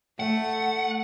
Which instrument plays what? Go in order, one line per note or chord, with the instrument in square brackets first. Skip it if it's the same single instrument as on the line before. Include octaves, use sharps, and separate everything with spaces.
[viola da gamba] A3 [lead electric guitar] F#5